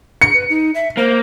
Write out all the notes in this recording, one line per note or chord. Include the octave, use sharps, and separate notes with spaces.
C#7
B4
D#4
E5
A#3 C5